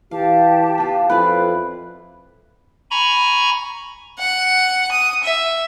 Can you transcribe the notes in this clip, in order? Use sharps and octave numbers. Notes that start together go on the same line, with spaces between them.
E3 G4 F5 A5
B3 F4
F2 E4 F4 B4 D5
G#5 A#5 B5 C#6
F#5
D#6
E5